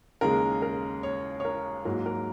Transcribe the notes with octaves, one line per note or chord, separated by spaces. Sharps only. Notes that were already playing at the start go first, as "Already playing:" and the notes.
D#2 C#3 G#3 A#4
A#4
C#5
C#5
A#4
G#2 F#3 A#3 A#4
A#4